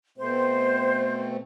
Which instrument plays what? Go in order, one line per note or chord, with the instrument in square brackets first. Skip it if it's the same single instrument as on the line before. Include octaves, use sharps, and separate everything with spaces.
[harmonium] B2 A3 C4 [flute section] C5